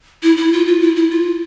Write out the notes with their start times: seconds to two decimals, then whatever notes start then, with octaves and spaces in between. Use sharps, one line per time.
0.23 E4
0.37 E4
0.52 F4
0.66 F4
0.81 E4
0.96 E4
1.10 F4